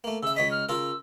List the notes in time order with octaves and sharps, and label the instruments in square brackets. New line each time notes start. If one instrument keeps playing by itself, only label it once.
[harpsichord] A3 A#3
[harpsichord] C#3 E5 [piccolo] E6
[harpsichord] C#2 C#5 D#5 [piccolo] B6
[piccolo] F6
[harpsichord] C#3 F4 A#4 [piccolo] E6